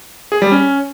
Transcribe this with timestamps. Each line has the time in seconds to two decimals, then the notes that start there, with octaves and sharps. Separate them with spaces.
0.32 G#4
0.42 G3
0.52 C#4